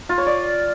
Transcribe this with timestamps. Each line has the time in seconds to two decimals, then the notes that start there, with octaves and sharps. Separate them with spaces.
0.09 F4
0.18 C#5
0.26 D5